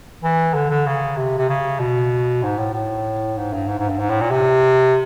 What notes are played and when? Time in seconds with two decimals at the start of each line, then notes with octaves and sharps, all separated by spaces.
0.23 E3
0.54 D3
0.70 D3
0.86 C#3
1.17 C3
1.38 C3
1.49 C#3
1.80 B2
2.43 G#2
2.58 A2
2.74 A2
3.37 G#2
3.53 G2
3.68 G#2
3.79 G#2
3.89 G2
3.99 G#2
4.10 A2
4.21 A#2
4.31 C3